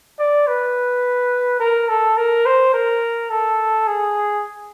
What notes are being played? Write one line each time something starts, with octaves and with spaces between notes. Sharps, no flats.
D5
B4
A#4
A4
A#4
C5
A#4
A4
G#4